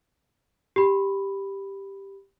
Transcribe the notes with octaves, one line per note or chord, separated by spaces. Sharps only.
G4 B5